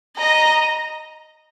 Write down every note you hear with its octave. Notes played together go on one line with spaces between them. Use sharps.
D#5 A#5